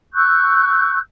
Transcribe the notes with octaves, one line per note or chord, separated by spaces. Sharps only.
C#6 E6 F#6 G6